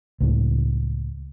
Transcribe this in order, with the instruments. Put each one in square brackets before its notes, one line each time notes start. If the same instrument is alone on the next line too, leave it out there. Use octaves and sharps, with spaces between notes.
[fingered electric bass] C#2 A2